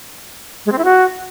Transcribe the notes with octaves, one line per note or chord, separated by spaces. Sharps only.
G#3
C4
E4
F#4